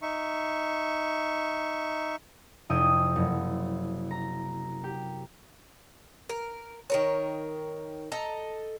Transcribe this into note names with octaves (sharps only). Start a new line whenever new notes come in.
D#4 E5 C#6
F1 F2 C3 E4 G5 D#6
F#1
A#5
G4
A#4
D#3 A#4 C#5
A4 D#5 A#5